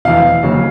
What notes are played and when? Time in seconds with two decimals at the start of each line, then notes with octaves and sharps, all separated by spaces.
0.05 F1 E2 B2 F5
0.43 F1 D#2 C#3 F#3